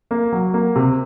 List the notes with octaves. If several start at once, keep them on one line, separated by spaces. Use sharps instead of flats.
A#3
F#3
A#3
C3